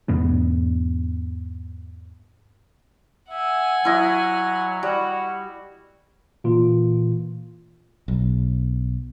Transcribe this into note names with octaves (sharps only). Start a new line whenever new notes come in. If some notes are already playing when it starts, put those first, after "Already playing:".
E2 G#2 B3 D4
E5 F#5 G#5
F#3 E4 D#5
G3 F#4
A#2 E3 F4
B1